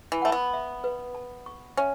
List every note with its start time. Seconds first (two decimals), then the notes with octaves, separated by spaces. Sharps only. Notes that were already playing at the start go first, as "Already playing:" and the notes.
0.12 E3
0.22 A3 F#5
0.32 B3
0.53 E5
0.84 B4
1.15 A5
1.46 C#6
1.77 C#4 E5